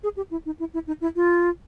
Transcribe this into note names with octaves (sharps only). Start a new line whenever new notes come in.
G#4
G4
E4
D#4
E4
E4
D#4
E4
F4